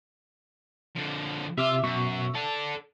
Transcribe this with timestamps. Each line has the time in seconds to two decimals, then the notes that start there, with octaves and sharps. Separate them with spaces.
0.95 D3 F3
1.58 C3 F4 E5 D6 E6
1.83 F#2 B2 C#6
2.35 A4 D5 A5